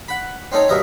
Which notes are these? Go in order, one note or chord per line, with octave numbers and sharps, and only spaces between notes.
F#5 B5
C4 C#4 D#4 A4 C#5
G2 B2 A#4 D#5 E5 A#5